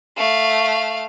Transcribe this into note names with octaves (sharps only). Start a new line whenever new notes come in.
A3 F5